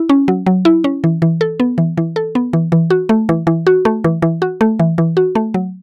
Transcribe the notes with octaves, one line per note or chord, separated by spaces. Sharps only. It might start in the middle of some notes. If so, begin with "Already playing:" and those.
Already playing: E4
C#4
F#3
F#3
E4
C#4
E3
E3
A4
B3
E3
E3
A4
B3
E3
E3
F#4
A3
E3
E3
F#4
A3
E3
E3
F#4
A3
E3
E3
F#4
A3
F#3